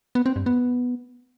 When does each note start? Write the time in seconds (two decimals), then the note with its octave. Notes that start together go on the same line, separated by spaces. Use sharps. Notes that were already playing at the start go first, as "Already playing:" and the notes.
0.15 B3
0.26 C4
0.36 G2
0.46 B3